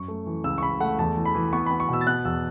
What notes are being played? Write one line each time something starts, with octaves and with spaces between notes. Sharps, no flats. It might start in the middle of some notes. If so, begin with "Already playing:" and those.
Already playing: F#2 C#6
A3
E3
C#2 E6
C#6
C#2 B5
A3 F#5
E2 A5
E3
B5
E3
B3 C#6
B5
B3
C#6
B2 E6
A6
B3 F#6
E2 E6